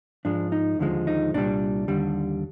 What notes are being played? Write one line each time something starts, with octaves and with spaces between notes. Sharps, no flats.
G#2 F3 G#3 D4
D#4
D#2 D3 F3 G#3
D#4
C2 A#2 G3 D4
D#2 D3 G3